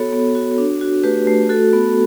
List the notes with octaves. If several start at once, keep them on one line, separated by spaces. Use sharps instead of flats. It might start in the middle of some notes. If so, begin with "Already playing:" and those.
Already playing: B3 F#4 A4 C#5
B3
F#4
D4
F#4
A3 G4 B4
A3
F#4 A4
B3